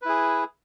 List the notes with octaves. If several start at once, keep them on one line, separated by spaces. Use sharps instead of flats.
E4 G#4 B4